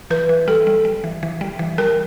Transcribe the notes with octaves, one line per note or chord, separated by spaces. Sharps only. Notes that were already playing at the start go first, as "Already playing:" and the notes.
E3 B4
E3
G3 A4
G3
G3
E3
E3
G3
E3
G3 A#4